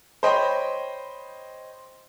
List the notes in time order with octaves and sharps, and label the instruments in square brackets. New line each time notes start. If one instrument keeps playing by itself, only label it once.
[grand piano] C5 C#5 D#5 G5 B5 C6